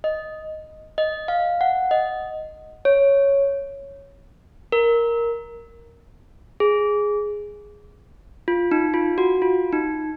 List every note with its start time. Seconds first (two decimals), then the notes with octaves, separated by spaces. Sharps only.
0.04 D#5
0.98 D#5
1.28 F5
1.61 F#5
1.91 D#5
2.85 C#5
4.72 A#4
6.60 G#4
8.48 F4
8.71 D#4
8.94 F4
9.18 F#4
9.42 F4
9.73 D#4